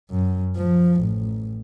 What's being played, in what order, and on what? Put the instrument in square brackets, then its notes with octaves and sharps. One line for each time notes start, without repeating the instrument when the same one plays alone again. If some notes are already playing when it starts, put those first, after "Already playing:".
[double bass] F#2
F3
A1